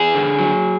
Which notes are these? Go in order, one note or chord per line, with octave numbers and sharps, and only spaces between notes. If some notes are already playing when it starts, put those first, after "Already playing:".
Already playing: E2 G#4
D3
F#3